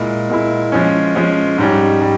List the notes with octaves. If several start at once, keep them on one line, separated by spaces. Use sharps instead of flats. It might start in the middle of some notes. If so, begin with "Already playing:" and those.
Already playing: A#2 G#3 E4
A#2 G#3 E4
F3 G#3 C#4
F3 G#3 C#4
G#2 G3 C#4
G3